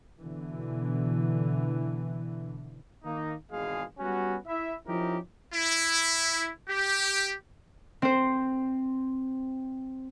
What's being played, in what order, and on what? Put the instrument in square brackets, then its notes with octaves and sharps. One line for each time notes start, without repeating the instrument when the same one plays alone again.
[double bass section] B2 D3 E3
[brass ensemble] D#3 A#3 D#4
G#1 E2 B2 G#3 G#4 F5
G3 B3 C#4 F#4
E4 E5
F3 C#4 D#4 E4 G4 A#4
[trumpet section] E4
G4
[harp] C4 C5